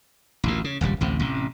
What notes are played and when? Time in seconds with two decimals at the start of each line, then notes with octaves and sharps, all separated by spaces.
0.44 A1 D2 A#2
0.64 C#3
0.81 D#1 G#1 C#2 G3
1.01 A1 D2 C3
1.20 A1 C3